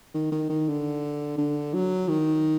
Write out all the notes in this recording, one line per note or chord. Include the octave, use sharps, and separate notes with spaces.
D#3
D#3
D#3
D3
D3
F#3
D#3